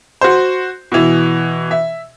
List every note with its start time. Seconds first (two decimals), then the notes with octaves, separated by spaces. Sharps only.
0.21 F#4 C5
0.92 B2 E3
1.71 E5